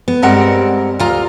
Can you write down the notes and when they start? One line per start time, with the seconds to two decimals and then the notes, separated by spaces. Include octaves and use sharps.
0.08 B3
0.22 G2 G3 G#3 C4 A#4 F#5
0.99 D2 F4 A#5